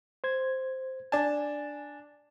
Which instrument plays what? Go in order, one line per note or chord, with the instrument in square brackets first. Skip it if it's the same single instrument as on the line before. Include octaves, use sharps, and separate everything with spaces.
[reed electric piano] C5 G#6
[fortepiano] D4 A5 [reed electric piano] G#5